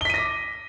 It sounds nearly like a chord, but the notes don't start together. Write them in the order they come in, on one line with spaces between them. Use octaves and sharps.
G7 B6 D#7 A#6 D6